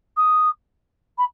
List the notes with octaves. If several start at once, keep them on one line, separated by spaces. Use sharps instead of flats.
D#6
B5